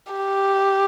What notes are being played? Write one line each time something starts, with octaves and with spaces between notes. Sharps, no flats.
G4